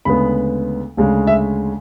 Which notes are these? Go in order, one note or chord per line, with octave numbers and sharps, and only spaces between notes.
D2 C#3 G#3 B3 B5
D2 C#3 G#3
E5